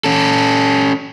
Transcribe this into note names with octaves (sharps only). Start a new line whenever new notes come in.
C#4 A4